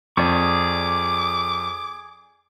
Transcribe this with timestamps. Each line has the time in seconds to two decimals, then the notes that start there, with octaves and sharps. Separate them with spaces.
0.17 F2 G#4 D5 C#6 D6